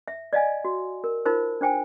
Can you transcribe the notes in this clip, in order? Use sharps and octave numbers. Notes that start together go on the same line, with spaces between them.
E5
D5 D#5 F5 G#5
F#4
A#4
D#4 F4 A#4 C5
D4 C5 G5 G#5